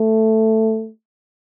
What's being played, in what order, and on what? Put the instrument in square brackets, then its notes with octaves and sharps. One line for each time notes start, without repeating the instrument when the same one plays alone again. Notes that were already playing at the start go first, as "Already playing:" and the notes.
Already playing: [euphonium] A3